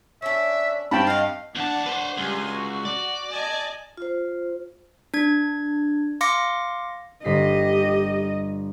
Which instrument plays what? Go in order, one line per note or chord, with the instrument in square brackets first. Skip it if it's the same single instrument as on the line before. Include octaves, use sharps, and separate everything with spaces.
[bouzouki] C#4 D4 [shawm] E5
[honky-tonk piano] G2 C4 [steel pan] G5 A5 B5
[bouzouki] D#5 F#5 [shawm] F5
[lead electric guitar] E2 A5 [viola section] D4 F#5
[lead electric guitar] B4 C5
[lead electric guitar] C#2 [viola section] G3 G#5 C6
[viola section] F#4
[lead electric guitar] D5
[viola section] D#5 G#5 A5
[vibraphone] F4 C5
[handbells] D4 G#6
F5 C6 D6 A#6 C#7
[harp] G1 B6 C7 [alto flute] G4 [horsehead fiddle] D#5